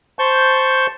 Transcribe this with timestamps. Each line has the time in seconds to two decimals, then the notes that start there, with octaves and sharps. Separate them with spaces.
0.19 C5 A5 C#6 G6